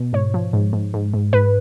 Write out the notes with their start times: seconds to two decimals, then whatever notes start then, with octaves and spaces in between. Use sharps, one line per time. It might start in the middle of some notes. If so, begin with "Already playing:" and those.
Already playing: B2
0.13 G#2 C#5
0.34 F3
0.53 G#2
0.73 G#2
0.94 G#2
1.14 G#2
1.33 G#2 B4